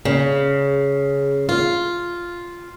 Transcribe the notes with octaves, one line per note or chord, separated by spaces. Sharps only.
C#3
F4